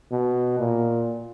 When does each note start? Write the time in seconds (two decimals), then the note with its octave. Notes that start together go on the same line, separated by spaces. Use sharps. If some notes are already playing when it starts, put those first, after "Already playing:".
0.12 B2
0.59 A#2